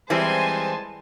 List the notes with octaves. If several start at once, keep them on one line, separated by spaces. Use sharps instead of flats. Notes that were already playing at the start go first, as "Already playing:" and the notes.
E3 G3 G#3 C4 C5 G#5 A5